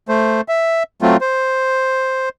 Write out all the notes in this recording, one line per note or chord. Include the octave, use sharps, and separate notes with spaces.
A3 C5
E5
F#3 A3 C4 F4
C5